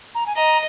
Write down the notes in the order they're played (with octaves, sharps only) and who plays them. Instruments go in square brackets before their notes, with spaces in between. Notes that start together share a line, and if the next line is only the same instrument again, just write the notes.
[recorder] A#5
G#5
[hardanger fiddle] D#5 [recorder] A#5